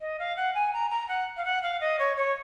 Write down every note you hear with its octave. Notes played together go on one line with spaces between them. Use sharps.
D#5
F5
F#5
G#5
A#5
A#5
F#5
F5
F#5
F5
D#5
C#5
C#5